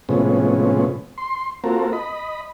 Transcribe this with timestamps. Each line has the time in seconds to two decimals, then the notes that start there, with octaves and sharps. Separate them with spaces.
0.09 A2 C3 F3 G#3 B3 C#4
1.18 C6
1.64 A#3 C4 F4 F#4 A4 A#4
1.93 D#5 B5